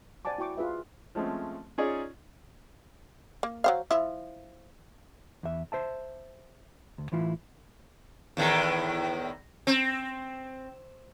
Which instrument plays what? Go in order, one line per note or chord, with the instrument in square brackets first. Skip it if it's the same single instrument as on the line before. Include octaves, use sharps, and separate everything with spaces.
[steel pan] C5 D5 F#5 G#5 A5 D6
E4 F#4 G5 C#6 D6
F4 G#4 B4 E5
[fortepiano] F3 G#3 A3 C4 C#4
C#4 D#4 F4 G#4 C#5 D5
[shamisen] A#3
F#3 C5 F5
F3 E4 E5
[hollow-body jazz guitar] E2 E5
C5 E5 A5
D2
A2 E3 E4 F4
[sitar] E2 A2 D#3
C4